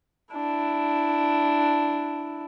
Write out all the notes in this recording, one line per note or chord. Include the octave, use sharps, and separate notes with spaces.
D4 E4